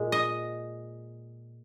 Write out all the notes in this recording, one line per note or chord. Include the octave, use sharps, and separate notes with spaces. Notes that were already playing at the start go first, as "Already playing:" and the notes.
Already playing: A#2 G#3
D#5